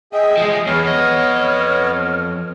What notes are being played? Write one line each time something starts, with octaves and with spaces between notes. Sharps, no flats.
G#4 D#5 E5 G5
F3 G#3 G#4
E2 B3 C#5 F6
F2 D#5